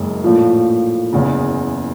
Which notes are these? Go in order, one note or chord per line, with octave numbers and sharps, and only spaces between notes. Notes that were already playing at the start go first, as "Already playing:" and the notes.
Already playing: F#1 F#2 G#3
A#1 A2 F3
F#1 E2 C#3